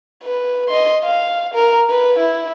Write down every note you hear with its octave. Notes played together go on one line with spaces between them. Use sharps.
B4
D#5 C6
F5
A#4
B4
E4